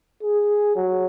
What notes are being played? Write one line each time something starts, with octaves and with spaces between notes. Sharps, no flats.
G#4
F#3